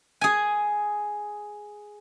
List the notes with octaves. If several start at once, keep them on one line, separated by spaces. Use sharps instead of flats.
G#4 G#5